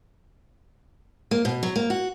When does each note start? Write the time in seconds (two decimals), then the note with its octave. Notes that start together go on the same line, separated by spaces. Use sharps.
1.31 A#3
1.45 B2
1.63 F#3
1.76 A#3
1.90 F#4